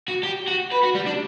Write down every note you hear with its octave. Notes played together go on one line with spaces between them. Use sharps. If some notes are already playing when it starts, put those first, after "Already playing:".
F#4
G4
F#4
B4
F#4
G3
D4